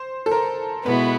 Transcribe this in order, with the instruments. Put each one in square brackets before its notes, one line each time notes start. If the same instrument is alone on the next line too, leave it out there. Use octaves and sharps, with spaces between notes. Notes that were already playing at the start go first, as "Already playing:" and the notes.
Already playing: [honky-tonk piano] C5
A4
A#4
[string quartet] B2 G#3 B3 E4 [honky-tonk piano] B4